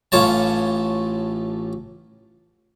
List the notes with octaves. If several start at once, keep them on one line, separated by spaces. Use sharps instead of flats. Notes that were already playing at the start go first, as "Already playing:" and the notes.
A1 A2 F4 C#5 A5